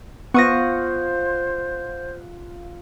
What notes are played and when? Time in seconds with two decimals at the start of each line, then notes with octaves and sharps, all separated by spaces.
0.34 B3 F4 C5 F5 F#5 C#6 D#6 A#6